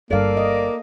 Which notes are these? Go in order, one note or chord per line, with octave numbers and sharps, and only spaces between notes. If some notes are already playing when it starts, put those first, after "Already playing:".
G1 G2 A#3 A4 D5 F5
D#5